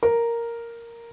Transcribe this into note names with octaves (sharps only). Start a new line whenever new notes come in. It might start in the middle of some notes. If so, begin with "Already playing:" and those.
A#4